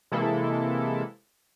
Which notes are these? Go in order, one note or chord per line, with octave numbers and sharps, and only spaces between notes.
C3 E3 G#3 A#3 E4 A4